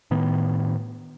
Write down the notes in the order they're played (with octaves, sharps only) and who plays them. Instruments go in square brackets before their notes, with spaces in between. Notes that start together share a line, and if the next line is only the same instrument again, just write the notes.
[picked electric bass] A2 D#3 B3